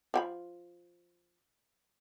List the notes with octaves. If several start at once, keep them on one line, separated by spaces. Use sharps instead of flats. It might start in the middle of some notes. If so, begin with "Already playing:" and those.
F3 G5 B5